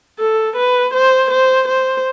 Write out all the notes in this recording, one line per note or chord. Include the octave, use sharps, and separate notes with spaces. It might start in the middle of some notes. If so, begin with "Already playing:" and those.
A4
B4
C5
C5
C5